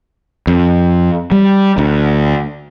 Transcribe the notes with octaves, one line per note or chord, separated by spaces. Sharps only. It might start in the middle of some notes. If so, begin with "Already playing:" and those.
F2
G3
D2